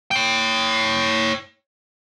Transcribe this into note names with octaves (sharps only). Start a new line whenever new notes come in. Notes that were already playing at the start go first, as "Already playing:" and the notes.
C#5 G5